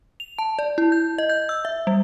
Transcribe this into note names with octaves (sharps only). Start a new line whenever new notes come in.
F7
A5
D5
E4
G6
D#5
G6
E6
E5
G3